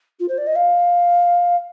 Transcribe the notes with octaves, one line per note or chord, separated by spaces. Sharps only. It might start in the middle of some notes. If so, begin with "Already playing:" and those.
F4
C5
D5
D#5
F5